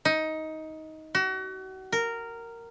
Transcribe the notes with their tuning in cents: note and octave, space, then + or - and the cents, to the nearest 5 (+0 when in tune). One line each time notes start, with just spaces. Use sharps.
D#4 +15
F#4 +35
A#4 -10